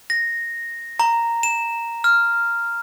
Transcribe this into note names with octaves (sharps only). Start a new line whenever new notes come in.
A#6
A#5
E7
F6